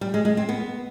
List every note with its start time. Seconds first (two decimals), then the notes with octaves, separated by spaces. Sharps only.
0.01 G3
0.14 G#3
0.25 G#3
0.37 C4
0.49 B3